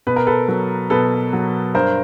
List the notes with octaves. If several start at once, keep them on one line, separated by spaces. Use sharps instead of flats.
B2 B4
A#4
A4 B4
F#3
B2 A4 B4
F#3
G2 A#4 C5